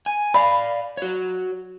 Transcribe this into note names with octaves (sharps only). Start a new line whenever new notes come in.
G#5
D5 F5 B5
F#4 C#5